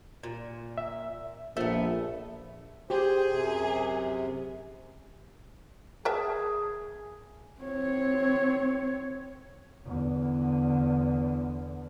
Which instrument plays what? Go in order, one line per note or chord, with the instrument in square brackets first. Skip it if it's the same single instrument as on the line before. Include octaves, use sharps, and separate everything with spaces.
[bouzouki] A#2
[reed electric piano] E5
[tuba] A#1 [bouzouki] A3 B3 [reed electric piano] E5
[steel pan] G4 [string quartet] G#4 [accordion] C5
[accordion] F#2 C3
[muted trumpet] G#4 [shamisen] A#4 E5 A5
[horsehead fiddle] C4 C#5
[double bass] E2 D3